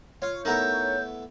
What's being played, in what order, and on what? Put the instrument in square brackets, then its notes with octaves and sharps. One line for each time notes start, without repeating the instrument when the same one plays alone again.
[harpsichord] F4 [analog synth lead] C#5
[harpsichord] A3 B3 E4 [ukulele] D#4 A#4 [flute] G6